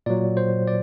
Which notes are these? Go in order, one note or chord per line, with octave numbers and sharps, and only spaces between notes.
A#2 F#3 D5
C5
D5